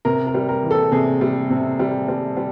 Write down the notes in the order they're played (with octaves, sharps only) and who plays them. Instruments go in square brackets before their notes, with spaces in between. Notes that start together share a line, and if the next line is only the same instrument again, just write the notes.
[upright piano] C3 A#4
A#4
G3
A#4
E3
A4
C3 G#4
G3
C3
G3
G3
G3